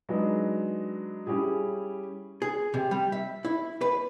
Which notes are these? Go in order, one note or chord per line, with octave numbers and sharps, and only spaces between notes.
F#3 G#3 B3 D4 D#4
G3 C#4 E4 G4 G#4
G#4
C3
G3
E5
E4
B4